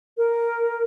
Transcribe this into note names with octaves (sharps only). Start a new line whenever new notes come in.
A#4